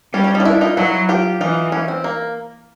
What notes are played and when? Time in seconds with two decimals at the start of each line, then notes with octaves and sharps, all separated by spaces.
0.13 G3 C#4
0.24 C#4
0.35 C#4 D#4
0.40 F4
0.45 D4 E4
0.61 D#4 F4
0.77 F#3 E4 F#4
1.09 F4 G4
1.41 E3 D#4 F4
1.72 C#4
1.88 C4
2.04 A#3